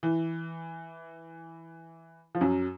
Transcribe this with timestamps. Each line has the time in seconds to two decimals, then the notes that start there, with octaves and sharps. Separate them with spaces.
0.03 E3
2.35 F3
2.41 F#2 F#3